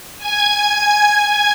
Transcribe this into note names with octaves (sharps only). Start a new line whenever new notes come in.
G#5 G#6